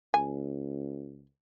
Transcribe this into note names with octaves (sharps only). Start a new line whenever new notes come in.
C#2 G#5